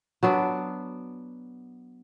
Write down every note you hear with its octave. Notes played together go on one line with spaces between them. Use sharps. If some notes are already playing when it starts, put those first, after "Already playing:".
F#3 B3 D4